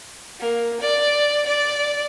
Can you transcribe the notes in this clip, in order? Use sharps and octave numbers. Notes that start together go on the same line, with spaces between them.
A#3
D5
D5